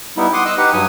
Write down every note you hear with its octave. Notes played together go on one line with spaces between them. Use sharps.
G3 B3 D#4 E4
F#5 C6 D6 D#6
D#5 E6 F#6
D#4 G4 B4 F#5
G2 F#3 G#5 D#6